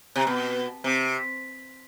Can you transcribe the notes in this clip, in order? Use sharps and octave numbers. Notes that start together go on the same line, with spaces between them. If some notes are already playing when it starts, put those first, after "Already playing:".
C3
B2
C3